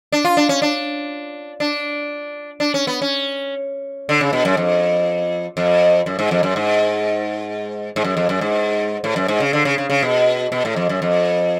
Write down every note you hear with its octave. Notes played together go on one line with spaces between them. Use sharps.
D4
F4
D4
C#4
D4
D4
D4
C#4
B3
C#4
D3
C#3
B2
F#2
F2
F2
F#2
G#2
F2
F#2
G#2
G#2
F#2
F2
F#2
G#2
A2
F#2
G#2
C#3
D3
C#3
C#3
C#3
B2
B2
A2
F2
F#2
F2